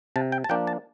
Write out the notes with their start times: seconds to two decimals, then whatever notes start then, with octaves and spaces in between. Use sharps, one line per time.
0.16 C3 A5
0.32 G5
0.44 A5
0.49 F3 A#3 D4 G5
0.67 A5